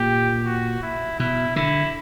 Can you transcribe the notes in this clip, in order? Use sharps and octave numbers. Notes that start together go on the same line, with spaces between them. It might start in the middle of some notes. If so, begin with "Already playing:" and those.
Already playing: A#2 G4
F#4
E4
B2 E4
D3 E4